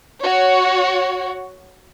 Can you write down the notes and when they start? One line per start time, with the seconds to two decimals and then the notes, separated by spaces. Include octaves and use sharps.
0.22 F#4 C#5